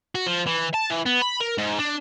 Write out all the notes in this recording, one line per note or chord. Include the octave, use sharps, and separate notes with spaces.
F#4
F3
E3
A5
E3
B3
B5
A#4
G#2
D4